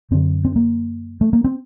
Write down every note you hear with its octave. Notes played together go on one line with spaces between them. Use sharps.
F#2 D3 C4
C4
A#3
A3
A#3
C4